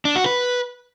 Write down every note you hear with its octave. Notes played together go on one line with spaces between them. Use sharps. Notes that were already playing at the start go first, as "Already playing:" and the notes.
D4
F#4
B4